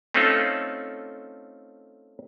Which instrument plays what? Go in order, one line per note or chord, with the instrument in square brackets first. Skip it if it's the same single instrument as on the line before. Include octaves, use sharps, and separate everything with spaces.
[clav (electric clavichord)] A3 C4 C#4 D#4 F4 A4